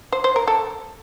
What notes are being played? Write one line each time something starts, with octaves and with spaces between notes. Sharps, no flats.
C5
C5
A#4
A4